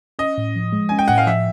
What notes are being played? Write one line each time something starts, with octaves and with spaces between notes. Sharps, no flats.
C#4 D#5
A2
F3
G#3
C#4 G#5
G5
A2 F#5
F5
F3 E5